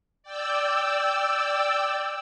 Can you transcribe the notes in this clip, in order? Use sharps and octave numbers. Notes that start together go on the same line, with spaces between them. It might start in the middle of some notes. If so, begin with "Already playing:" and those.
D5 G5 E6